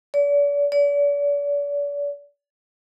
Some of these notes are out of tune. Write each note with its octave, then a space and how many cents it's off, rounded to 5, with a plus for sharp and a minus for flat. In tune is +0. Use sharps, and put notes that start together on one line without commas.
D5 -40
D5 -40